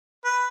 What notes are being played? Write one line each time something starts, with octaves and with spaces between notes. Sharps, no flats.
B4